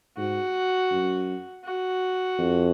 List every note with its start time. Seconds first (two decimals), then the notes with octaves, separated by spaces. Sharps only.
0.17 G#2 F#4
0.91 F#2
1.65 F#4
2.38 F2